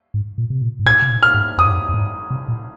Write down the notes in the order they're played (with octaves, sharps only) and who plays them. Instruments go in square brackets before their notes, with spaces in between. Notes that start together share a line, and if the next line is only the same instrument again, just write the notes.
[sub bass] G#2
A#2
C3
A#2
G#2
[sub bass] A#2 [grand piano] G#6
[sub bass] C3
A#2
[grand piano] F6
[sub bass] G#2
[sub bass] F2 [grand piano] D#6
[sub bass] G#2
F2
F2
G#2
C3
A#2